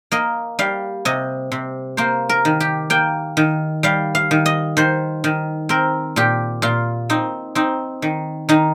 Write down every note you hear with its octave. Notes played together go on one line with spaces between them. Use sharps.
A#3 D#5
G3 F5
C3 D#5
C3
A#3 C5
A#4
D#3
G4
A#3 G5
D#3
G3 F5
F5
D#3
D#5
D#3 C5
D#3
C4 A#4
A#2 G4
A#2 F4
C4 D#4
C4 D#4
D#3
D#3 D#4